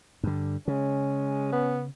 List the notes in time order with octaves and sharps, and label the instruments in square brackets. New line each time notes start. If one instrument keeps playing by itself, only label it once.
[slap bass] G2 D3
[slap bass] C#3 [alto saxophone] G#3 [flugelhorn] C#4
[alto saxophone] B3